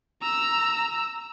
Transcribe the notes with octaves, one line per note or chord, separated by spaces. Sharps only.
A#5 E6